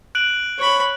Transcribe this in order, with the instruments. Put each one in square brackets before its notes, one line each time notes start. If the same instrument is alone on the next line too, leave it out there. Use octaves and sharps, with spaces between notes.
[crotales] F#6 D7 F#7
[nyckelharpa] C#5 B5